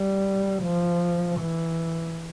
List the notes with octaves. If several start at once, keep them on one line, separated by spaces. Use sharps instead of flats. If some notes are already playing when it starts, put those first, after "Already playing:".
Already playing: G3
F3
E3